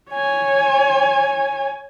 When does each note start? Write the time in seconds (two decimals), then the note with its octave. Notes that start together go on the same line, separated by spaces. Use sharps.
0.11 C#5 G#5